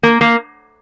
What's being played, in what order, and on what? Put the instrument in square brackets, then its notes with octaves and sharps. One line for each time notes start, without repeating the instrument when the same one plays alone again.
[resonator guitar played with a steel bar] A#3
A#3